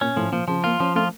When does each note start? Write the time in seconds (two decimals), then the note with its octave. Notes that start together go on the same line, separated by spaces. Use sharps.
0.01 A#2 C#4
0.16 A2 F3
0.32 A#2 F3
0.48 C#3 F3
0.64 A#3 F4
0.80 F3 C#4
0.96 A3 F4